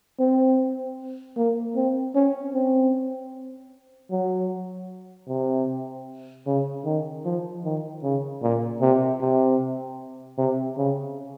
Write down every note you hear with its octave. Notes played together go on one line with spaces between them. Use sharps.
C4
A#3
C4
C#4
C4
F#3
C3
C#3
D#3
F3
D#3
C#3
A#2
C3
C3
C3
C#3